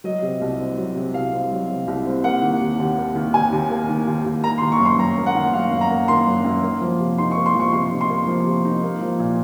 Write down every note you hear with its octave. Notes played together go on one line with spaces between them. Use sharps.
F#3 D#5
C3
C2
C4
F#3
C3
C2 F5
C4
F#3
C3
C2
C4
A#3 F#5
D#3
D#2
D#2
A#3
D#3
D#2 G#5
D#2
A#3
D#3
D#2
D#2
A#3 A#5
C6
D#3
C#6
F#2
C6
F#2 A#5
A#3
F#5
D#3
F#2 F5
F#2
A#5
A#3
D#3 C6
F#2
F#2
A#3
F3
C3
D#4 C6
C#6
A#3
C6
F3 C#6
C3 C6
D#4
C6
A#3
F3
C3
D#4
A#3
F3
A#2